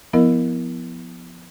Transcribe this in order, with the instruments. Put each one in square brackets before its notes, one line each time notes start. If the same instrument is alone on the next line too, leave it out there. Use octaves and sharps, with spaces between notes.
[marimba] F3 B3 E4 A#4 D#5